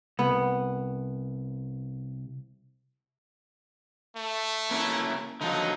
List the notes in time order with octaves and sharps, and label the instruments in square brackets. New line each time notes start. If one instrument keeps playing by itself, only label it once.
[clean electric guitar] C2 [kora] B3
[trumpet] A3
[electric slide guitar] A#3 C#4 E4
[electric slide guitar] D3 F3 F#3 [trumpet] D#4